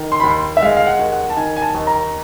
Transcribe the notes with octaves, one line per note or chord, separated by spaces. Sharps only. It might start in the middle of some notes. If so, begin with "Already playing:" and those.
Already playing: D#3
C6
B5
D#2 C6
E5
G#3 F5
F5
F#5
D#2
F#5
A5
D#3 G#5
G#5
A5
D#2
A#5